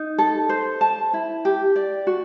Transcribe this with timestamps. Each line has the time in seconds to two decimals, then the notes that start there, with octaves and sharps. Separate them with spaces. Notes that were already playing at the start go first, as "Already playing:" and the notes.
Already playing: D#4
0.18 A4
0.49 C5
0.81 A5
1.13 E4
1.45 G4
1.76 D5
2.07 F#4